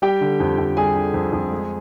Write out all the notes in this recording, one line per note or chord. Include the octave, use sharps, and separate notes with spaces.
G3 G4 G5
D3
F2
F2
G3 G#4 G#5
D3
F2
F2
G#3